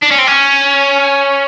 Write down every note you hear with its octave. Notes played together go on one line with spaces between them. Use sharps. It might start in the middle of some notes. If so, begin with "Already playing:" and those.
D4
C#4
C4
C#4